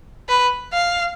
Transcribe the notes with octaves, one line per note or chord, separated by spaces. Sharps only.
B4
F5